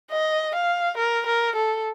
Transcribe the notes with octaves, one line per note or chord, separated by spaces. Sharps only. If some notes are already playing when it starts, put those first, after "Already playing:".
D#5
F5
A#4
A#4
A4